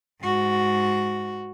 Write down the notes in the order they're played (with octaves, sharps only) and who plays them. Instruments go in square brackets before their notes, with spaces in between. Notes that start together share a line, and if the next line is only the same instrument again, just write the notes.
[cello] G#2 F#4